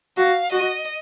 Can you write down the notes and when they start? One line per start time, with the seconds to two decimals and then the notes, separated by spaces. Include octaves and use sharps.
0.17 F#4 F5
0.52 F#4 D#5